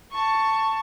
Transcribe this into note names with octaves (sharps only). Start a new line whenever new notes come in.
A5 C#6